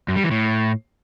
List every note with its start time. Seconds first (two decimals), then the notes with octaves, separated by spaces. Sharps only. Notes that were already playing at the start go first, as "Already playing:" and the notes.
0.08 F#2
0.16 G3
0.23 E3
0.31 A2